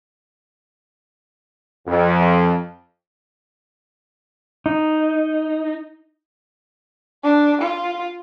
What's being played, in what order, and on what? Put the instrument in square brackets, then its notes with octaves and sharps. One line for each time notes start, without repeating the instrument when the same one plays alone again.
[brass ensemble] F2
[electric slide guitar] D#4
[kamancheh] D4
F4